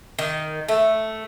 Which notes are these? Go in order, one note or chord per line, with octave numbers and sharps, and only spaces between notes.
D#3
A3